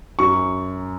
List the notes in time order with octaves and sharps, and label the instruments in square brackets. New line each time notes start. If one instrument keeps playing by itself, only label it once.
[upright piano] F#2 C#6